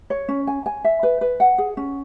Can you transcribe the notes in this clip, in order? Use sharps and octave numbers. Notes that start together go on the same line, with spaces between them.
C#5
C#4
G#5
G#5
E5
B4
B4
F#5
G#4
C#4